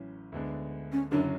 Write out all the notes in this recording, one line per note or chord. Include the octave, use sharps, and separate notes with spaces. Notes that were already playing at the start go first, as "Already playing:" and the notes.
Already playing: A1 A2 F#3 C#4
D2 D3 G#3 B3 D4
C#4
F#1 F#2 D3 F#3 C#4 D4